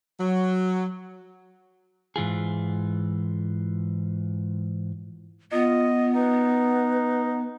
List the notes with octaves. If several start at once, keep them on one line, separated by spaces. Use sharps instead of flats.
F#3
G#2 E3 F4 G#4
B3 F4 D#5
D#4 B4